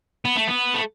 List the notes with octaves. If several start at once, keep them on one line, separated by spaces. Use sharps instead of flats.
B3
A3
B3
A3